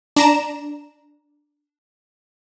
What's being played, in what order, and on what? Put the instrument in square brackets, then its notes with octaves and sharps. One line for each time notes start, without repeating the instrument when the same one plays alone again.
[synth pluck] D4 A#5 E7